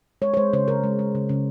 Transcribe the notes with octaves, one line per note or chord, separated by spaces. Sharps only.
G#3 C#5
C#5
G#3 C5
C#3 C5
C#3 A#4
G#3
G#3
C#3
C#3